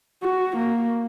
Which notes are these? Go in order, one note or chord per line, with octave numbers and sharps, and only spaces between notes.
F#4
A#3